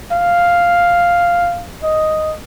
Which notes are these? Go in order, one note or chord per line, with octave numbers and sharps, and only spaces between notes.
F5
D#5